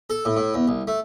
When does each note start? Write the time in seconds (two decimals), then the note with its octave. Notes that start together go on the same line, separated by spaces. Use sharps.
0.10 A4
0.25 A2
0.37 A2
0.54 E2
0.68 C2
0.87 A3